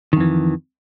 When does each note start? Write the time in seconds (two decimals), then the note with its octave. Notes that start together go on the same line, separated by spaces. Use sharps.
0.13 D#3
0.17 F2
0.20 E3